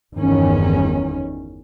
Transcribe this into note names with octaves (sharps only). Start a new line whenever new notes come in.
G1 E2 D#3 C#4